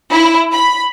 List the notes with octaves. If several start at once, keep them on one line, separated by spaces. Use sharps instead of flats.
E4
B5